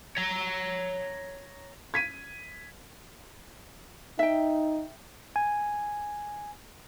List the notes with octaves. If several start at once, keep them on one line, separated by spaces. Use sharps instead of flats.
C#5 A#5
G#6 B6 D#7
D#4 E5 G5
G#5